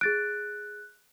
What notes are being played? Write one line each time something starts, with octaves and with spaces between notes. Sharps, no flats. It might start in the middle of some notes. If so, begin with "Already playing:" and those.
G#4 F#6 A6 D7